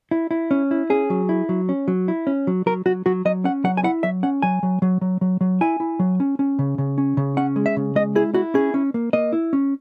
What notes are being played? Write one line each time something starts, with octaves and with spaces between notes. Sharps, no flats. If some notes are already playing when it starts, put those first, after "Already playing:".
E4
E4
C#4
E4
C#4 G#4
F#3
E4
F#3
C#4
F#3
E4
C#4
F#3
F#3 A#4
F#3 F#4
F#3 F#4
F#3 D#5
C#4 F#5
F#3 F#5
G#5
E4 F#5
F#3 E5
C#4 F#5
F#3 G#5
F#3
F#3
F#3
F#3
F#3
E4 G#5
E4
F#3
C#4
C#4
C#3
C#3
C#4
C#3
C#4 F#5
G#3
E5
C#3
G#3 D#5
E4 G#4
E4 F#4
C#4 G#4
C#4
A#3
A#3 D#5
E4
C#4